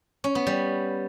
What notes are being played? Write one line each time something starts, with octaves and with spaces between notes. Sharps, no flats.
C#4
B3
G3